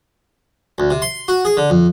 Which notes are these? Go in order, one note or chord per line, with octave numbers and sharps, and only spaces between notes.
D2
C3
C6
F#4
G#4
D3
F2